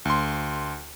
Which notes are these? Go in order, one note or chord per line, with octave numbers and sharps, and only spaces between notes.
D2 C6